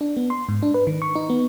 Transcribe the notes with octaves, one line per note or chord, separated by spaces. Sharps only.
D4
B3
C6
G#2
D4
B4
D#3
C#6
D#4
B3